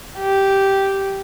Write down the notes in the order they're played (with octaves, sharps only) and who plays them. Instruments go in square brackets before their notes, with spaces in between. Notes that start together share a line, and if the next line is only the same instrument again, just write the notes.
[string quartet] G4